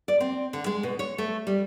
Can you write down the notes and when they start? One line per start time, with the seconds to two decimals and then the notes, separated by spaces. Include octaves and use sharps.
0.08 D5
0.20 C4
0.53 D3
0.66 G#3
0.83 B2
0.99 C#5
1.18 A3
1.47 G3